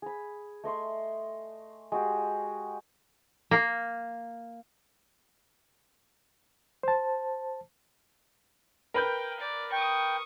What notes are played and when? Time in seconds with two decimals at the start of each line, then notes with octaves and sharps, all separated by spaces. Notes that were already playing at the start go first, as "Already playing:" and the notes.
0.02 G#4 B5
0.64 A3 D#5 C6 C#6
1.92 G#3 F#4 G4
3.51 A#3
6.83 C5 A5
8.94 A#4 B4 G5 G6
9.40 D5
9.72 G5 C#6 D#6